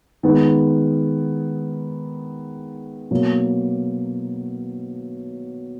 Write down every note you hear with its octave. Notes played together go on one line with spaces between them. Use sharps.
D#3 G#3 B3
B2 F#3 A#3